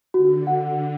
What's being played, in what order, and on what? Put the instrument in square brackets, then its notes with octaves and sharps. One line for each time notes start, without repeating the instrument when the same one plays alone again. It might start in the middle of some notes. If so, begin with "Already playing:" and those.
[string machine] D3 [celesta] F#4
[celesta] F#5